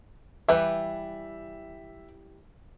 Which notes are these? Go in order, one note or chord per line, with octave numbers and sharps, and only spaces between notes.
E3 G3 B4 E5